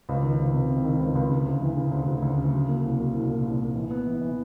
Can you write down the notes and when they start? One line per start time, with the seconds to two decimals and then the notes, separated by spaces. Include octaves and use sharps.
0.09 C#2
0.23 D#3
0.39 C#2
0.54 C3
0.70 C3
0.84 D#3
1.00 C#2
1.15 C#2
1.30 C#3
1.46 D2
1.61 E3
1.77 C#3
1.91 D2
2.07 D2
2.22 D2
2.38 C#3
2.53 F#3
2.69 A#3
2.83 C2
2.98 F#3
3.15 C2
3.30 A#2
3.45 C2
3.60 A#2
3.75 E3
3.91 B3
4.07 E3
4.21 E3